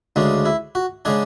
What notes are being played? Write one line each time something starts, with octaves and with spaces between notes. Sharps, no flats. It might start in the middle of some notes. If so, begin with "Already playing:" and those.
D2 C#3 G#3 D4
E4
F#4
C#3 G#3 D4 G#4